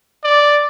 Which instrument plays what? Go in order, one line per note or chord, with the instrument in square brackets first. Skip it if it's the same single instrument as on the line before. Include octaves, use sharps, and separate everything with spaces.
[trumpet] D5